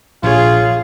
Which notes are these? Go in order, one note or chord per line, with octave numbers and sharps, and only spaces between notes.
A#1 F4 G#4 C#5